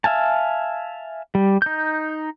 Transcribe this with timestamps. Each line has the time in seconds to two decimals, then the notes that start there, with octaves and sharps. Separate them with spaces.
0.04 E5 F5 G#5 A5
1.35 G3
1.62 D#4 G6